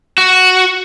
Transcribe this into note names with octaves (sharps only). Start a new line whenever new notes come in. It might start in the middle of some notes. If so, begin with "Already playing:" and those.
F#4